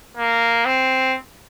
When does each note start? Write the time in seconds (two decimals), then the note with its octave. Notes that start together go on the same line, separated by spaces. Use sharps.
0.18 A#3
0.66 C4